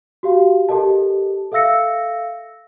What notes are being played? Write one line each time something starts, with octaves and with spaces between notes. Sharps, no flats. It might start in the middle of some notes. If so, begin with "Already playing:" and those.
F#4 G4 F5
G4 A4 A#4 D#5 A5
A4 E5 F5 E6 A#6 C#7